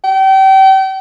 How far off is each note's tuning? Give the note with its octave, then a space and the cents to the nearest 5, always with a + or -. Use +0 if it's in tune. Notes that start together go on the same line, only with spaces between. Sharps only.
G5 -35